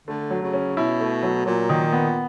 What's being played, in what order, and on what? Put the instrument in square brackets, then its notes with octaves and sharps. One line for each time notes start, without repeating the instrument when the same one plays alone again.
[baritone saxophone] D3 [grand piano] A3
[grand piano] F#3
[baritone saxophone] C#3
[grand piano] C#4
[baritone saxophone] B2 [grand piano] E4
[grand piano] A3
F#3
[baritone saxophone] A#2 [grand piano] F#3
[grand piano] D#3
B3